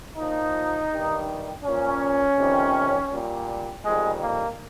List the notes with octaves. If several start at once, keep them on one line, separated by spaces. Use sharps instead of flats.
A#2 F3 D#4
G2 D#3 G3
A#2 F3 C#4
F2 C3 D#3 G3
A#2 G3
F2 D#3 G3 G#3
A#3